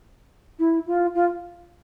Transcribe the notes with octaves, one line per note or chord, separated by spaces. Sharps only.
E4
F4
F4